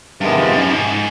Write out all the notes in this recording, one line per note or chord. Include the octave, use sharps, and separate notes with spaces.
G2 C3 D#3 G#3 B3
F2
F#2
G#2